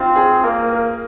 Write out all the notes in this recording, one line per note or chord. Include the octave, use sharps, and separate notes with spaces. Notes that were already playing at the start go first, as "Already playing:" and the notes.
Already playing: C4 D#4 F4
G#4
A#3 A#4
A#4